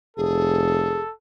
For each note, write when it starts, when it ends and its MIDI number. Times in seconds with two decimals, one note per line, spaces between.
0.17 1.02 29
0.17 1.01 68
0.17 1.12 69